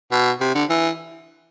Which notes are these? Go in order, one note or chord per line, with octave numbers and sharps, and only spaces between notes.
B2
C3
D3
E3